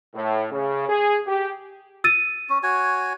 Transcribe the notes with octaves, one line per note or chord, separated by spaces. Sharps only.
A2
C#3
G#4
G4
E6 A6 D#7
C#4
F#4 C#5 G#5